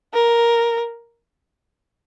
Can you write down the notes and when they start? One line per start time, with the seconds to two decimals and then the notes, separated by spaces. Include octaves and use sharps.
0.14 A#4